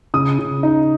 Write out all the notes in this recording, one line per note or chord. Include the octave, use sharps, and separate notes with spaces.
C#3 D#6
C#3
D#4